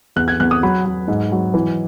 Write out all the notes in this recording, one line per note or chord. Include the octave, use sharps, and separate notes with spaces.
E2 F#6
G#6
E2 F#6
D#6
F#3 B5
F#3
G#2
F#3
E3